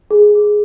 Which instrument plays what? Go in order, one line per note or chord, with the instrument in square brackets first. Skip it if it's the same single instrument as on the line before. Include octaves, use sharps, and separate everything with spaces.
[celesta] G#4